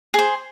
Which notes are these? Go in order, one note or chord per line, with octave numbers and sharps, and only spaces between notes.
G#4 C5